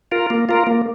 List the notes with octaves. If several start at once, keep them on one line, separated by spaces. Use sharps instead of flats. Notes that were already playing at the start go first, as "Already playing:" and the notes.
F4 A#4
A#3
F4 A#4
A#3